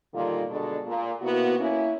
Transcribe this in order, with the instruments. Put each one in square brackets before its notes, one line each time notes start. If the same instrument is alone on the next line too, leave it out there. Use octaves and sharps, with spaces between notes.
[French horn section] A#2 D3 D#3 G3 A#3 F4
B2 D3 G#3 D4 A4
A#2
C3 A#3 B3 E4 F#4
A#3 C#4 E4